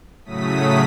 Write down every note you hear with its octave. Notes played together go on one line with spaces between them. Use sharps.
A2 C#3 F#3 A3 D#6 B6